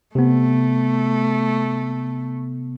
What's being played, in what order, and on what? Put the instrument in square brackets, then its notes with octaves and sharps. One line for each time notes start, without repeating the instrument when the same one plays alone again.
[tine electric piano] C3 B3 [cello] A3